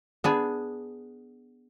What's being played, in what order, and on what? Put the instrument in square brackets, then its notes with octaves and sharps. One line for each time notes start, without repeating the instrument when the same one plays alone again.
[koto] B3 D4 G#4